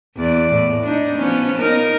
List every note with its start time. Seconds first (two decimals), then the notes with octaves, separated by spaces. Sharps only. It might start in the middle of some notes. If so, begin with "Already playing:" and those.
0.16 E2 D5
0.52 A2
0.83 D4 D#4
1.16 F3 B3 C#4
1.58 D#4 A#4